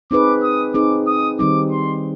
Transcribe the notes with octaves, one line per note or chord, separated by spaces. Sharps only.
C4 D#4 G#4 B4 D6
D#6
C4 D#4 G#4 B4 D6
D#6
D#3 G3 C4 D#4 D6
C6